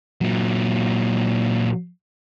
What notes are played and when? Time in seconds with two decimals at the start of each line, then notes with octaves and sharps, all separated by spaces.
0.21 A#2 F#3